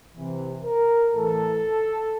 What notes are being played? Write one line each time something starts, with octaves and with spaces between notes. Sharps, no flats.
C3 E3
A#4
A2 E3 A4